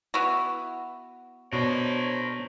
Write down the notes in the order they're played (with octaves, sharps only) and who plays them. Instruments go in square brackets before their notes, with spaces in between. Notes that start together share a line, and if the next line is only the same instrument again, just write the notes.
[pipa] B3 E4 F#4
[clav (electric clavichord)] B2 D4 [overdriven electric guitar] A#4 C5 [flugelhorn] C#5